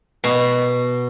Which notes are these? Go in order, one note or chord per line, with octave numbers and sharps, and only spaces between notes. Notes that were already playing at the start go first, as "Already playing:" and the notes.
B2